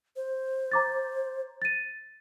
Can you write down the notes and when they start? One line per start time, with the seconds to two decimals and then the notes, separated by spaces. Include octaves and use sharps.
0.16 C5
0.72 A#5 D6 A6
1.62 A6 D#7